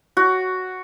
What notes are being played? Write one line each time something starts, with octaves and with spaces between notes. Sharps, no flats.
F#4